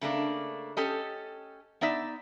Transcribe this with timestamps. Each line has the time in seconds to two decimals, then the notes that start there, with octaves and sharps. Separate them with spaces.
0.01 C#3 A3 A#3 D4
0.77 C#4 G4 A4 D#5
1.81 B3 D#4 D5 E5